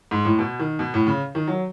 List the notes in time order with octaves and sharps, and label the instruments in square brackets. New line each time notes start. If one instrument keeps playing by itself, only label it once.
[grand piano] G#2
A2
B2
D#3
B2
A2
C#3
D#3
F#3